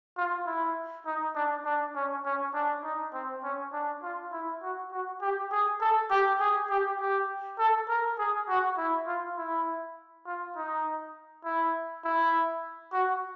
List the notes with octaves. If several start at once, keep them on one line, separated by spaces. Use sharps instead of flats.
F4
E4
D#4
D4
D4
C#4
C#4
D4
D#4
C4
C#4
D4
F4
E4
F#4
F#4
G4
G#4
A4
G4
G#4
G4
G4
A4
A#4
G#4
F#4
E4
F4
E4
F4
D#4
E4
E4
F#4